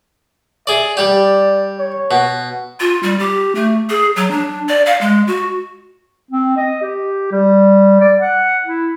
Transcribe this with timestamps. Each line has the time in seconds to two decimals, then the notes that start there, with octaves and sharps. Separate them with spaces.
0.67 G#4 D5 E5
0.97 G3 G4 D5
1.79 C#5
2.11 B2
2.80 F4
3.03 G3
3.19 G4
3.55 A3
3.90 G#4
4.16 F#3
4.31 D4
4.69 D5
4.86 F5
5.01 G#3
5.27 F#4
6.31 C4
6.57 D#5
6.81 G4
7.31 G3
8.00 D5
8.20 F#5
8.64 E4